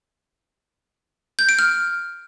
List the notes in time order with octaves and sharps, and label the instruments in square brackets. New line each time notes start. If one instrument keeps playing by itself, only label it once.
[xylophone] G6
D7
F6